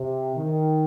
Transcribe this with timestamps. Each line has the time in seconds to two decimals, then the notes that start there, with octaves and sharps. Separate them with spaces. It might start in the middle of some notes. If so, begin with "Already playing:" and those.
Already playing: C3
0.36 D#3